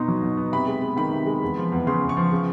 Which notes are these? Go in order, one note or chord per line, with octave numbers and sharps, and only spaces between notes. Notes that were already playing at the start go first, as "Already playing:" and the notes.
Already playing: B2 B3 D#4 C6
F#3
B2
B3
C3 B5
G#3
B3
D#3 B5
C3
G#3
E2
F3
E2
C#3 C6
E2
C#6
F3
C#3